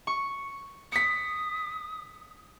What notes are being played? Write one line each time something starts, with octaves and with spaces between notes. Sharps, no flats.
C#6
D#6 B6 C#7